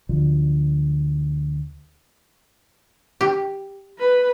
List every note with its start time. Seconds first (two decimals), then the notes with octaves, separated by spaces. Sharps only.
0.09 D2 D3 F3
3.21 G4
3.99 B4